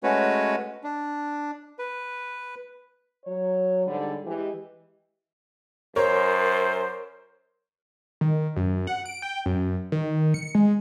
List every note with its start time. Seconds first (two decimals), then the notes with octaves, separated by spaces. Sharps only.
0.03 G#3 A3 C#4 F#4 B4 C#5
0.84 D4
1.79 B4
3.25 F#3 C#5
3.87 G#2 D3 G3
4.25 E3 G#3 G4
5.96 F#2 A#4 C5 C#5
8.21 D#3
8.56 F#2
8.87 F#5
9.06 D7
9.22 G5
9.46 F#2
9.92 D#3
10.34 C#7
10.55 G#3